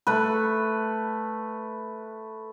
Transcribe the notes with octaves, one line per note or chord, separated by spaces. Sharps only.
A3 B4